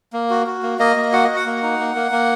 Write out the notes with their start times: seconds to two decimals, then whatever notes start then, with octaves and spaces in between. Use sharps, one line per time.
0.13 A#3
0.30 F#4
0.47 F#4
0.63 A#3
0.79 A#3 D#5
0.96 A#3
1.13 F#4 F#5
1.24 F#4 D#5
1.36 F#5
1.46 A#3
1.63 D#4
1.79 A#3
1.95 A#3
2.11 A#3